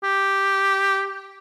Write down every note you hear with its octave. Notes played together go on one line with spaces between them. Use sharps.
G4